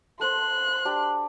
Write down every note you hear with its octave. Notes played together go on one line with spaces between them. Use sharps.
A4 C5 C6 F#6
D4 G4 D5